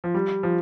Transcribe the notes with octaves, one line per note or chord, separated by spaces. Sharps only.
F3
G3
F3